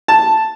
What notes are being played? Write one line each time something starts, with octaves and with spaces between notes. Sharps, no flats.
A5